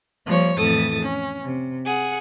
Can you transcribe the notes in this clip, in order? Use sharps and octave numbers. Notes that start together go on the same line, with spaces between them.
F3 G3 A#3 C#5
F2 A2 E3 A4 D#6 A6
C#4
C3
G#4 F#5